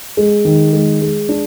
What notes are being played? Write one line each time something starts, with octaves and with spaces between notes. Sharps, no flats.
G#3
D#3
G#3
G#3
D4